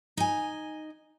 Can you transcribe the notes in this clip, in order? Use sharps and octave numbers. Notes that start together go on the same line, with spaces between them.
D#4 G#5